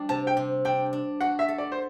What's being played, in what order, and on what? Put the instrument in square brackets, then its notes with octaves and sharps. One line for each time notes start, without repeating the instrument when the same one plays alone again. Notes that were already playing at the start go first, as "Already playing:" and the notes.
Already playing: [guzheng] G3 D4
[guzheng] C3 [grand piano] A5
[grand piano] G5
[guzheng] C3
[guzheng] D4 [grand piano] G5
[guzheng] D4
[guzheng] F#4 [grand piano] F#5
[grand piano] E5
[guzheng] A4
[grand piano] D5
C5